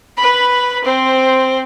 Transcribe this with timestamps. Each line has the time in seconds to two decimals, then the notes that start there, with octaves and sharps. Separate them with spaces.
0.17 B4 B5
0.85 C4 C5